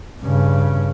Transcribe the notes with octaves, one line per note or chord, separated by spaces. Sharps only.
G2 C#3